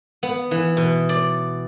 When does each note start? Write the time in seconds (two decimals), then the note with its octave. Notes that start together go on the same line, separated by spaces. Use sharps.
0.23 B3
0.51 E3
0.77 B2
1.09 D5